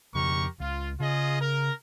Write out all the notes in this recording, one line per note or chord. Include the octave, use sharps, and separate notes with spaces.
F2 C#3 G4 A#4 C#6
C#2 F4
C#3 F4 G#4 D#5
A#4